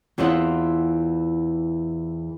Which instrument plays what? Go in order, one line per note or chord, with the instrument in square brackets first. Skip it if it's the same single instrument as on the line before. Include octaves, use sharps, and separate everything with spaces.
[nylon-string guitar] E2 E3 C4 F4 D#5 F#5